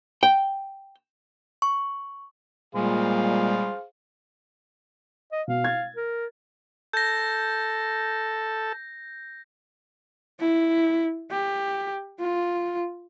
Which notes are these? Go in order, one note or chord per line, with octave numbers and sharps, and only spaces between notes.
G5
C#6
A#2 G3 G#3 G#4 C5 F5
D#5
B2 F5
G#6 A6
A#4
A4 G6 A#6
E4
G4
F4